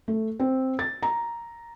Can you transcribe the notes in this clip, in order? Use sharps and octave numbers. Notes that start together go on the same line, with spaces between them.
A3
C4
A6
A#5